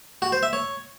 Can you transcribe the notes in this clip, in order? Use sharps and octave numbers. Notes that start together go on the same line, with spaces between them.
F#4
C5
E5
C#5